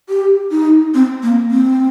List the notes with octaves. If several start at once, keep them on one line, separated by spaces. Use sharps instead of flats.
G4
D#4
C4
A#3
C4